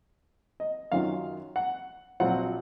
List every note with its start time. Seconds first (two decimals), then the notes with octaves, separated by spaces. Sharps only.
0.60 D#5
0.92 F#2 D#3 F#3 C#4 F4 F5
1.56 F#5
2.20 A#1 A#2 F#3 C4 F4 F#5